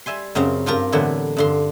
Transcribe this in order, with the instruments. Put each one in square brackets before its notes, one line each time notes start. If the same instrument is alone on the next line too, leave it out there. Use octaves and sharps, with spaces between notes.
[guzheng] G3 E5 G#5 C6
F#2 C#3 C4 F5 A#5
G2 F4 G4 A#4
A2 D3 E3 F#3 B3
G2 D3 C6